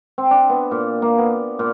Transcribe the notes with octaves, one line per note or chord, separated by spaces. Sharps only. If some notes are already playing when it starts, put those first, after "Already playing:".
C4
D4
B3
A#2
A#3
B3
A#2